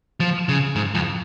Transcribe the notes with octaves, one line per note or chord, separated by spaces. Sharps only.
F3
C#3
G#2
F2